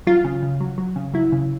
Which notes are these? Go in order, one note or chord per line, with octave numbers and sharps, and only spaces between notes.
F#3 F4
C#3
C#3
F#3
F#3
C#3
F#3 E4
C#3